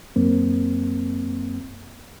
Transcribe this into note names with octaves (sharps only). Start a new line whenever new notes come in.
F#2 A#3 C4